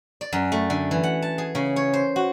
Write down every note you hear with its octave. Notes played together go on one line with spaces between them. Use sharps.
D5
F#2
A3
D3
E3
F#5
A5
G#4
C#3
C#5
C5
F#4